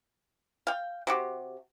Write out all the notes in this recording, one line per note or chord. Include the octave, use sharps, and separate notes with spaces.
F5 G5
C3 F#4 G4